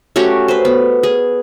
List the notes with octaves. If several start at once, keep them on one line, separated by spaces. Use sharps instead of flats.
A3 C#4 F#4 G4
B4 C5
B3
G#4